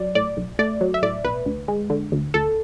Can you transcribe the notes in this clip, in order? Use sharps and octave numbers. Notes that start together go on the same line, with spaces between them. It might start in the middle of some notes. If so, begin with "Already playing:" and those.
Already playing: F#3 D5
A2 D5
B1
A3 D5
F#3
E5
A2 D5
B1 B4
D2
G#3
D3
D2
D2 A4